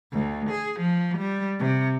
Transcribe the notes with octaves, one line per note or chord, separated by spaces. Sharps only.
D2
G#4
F3
G3
C3